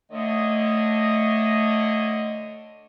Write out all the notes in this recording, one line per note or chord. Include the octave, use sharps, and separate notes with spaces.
D3 A3 C#5 D#5